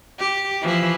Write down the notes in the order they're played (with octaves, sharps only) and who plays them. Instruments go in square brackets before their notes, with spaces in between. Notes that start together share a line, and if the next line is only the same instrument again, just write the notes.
[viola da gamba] G4
E3 F3 E4